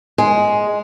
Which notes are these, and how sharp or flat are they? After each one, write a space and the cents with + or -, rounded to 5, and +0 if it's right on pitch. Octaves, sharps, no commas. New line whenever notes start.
G#3 +5